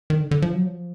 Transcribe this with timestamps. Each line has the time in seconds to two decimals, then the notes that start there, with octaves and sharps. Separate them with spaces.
0.10 D#3
0.20 D3
0.31 D3
0.42 F3
0.54 F#3
0.66 F3